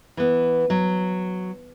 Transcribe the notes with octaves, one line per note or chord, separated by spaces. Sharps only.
E3 B3
F#3